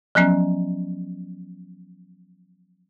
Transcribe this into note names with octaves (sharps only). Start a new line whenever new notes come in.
F3 F#3 B3 C#4